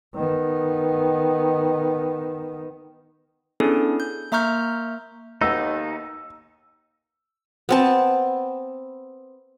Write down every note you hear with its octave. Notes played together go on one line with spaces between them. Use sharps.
D#3 B3
B3 C#4 D4 E4 G#4 A4
G6
A#3 E5 A#5 C#6 F6 G6
D#2 A3 B3 D#4 F#4 E6
B3 C4 A5